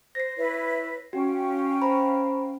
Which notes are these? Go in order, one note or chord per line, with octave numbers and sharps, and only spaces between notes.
C5 A#6 C7
E4 B4 C#5
C#4 F#4 F5 G5
C5 A#5 B5